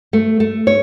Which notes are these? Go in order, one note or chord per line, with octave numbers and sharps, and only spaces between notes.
A3
A3
C#5